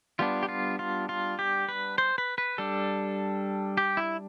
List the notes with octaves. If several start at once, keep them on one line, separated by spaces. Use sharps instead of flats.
G3 B3 D4 F4
G4
F4
F4
F4
G4
B4
C5
B4
B4
G3 D4 A4
G4
E4